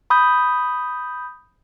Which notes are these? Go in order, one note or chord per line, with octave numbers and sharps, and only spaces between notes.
B5 D#6 G6